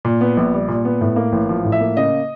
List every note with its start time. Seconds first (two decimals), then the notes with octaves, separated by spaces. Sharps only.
0.05 A#2
0.21 B3
0.37 A#1
0.53 G3
0.68 A#2
0.85 B3
1.01 A2
1.16 A#3
1.32 A1
1.49 F3
1.64 A2
1.72 E5
1.80 A#3
1.97 C#3 D#5